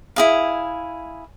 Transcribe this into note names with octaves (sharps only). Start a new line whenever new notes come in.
E4 G#4 F5